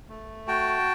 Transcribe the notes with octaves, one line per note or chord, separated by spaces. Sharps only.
A3
F#4 G5 A5